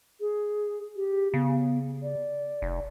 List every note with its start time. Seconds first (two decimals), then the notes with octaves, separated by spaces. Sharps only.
0.20 G#4
0.96 G4
1.34 C#3 B3
2.03 D5
2.62 F1